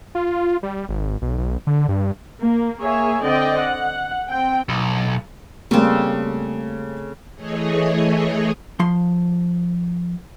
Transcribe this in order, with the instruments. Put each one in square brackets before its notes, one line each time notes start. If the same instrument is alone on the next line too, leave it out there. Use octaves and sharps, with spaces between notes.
[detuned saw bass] F4
G3
G#1
B1
B1
D3
G2
[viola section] A#3
A#3 G#4 C#5 E5 G#5
D3 C4 D5 D#5 G5
F#5
C4 G5
[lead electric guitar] B1
[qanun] C#3 C4 [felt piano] G3 A#3 [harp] A3
[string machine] E3 A3 G#4 C#5 D#5
[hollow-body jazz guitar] F3 C6